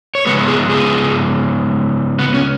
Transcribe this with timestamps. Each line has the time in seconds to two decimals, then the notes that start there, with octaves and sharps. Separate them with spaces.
0.15 C#5
0.26 C#3 G#3 B3 B4
0.48 G#4
0.69 G#4
2.19 B3
2.34 C#4